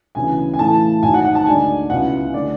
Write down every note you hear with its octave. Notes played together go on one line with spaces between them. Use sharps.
D2 C#3 E3 B3 G#5
G#5
A2 E3 A3 E4 A5
G#1 G#2 F#3 G#5
F#5
F#5
A5
D2 D3 G#3 D4 G#5
C#2 C#3 F#3 B3 E4 F#5
D3 A3 D4 D5